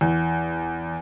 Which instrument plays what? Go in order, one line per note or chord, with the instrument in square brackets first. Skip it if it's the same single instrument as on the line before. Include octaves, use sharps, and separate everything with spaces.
[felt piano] E2